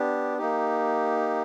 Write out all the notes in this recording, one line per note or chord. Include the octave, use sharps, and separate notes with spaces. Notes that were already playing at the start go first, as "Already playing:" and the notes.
Already playing: B3 D4 G4
A#3 D#4 G4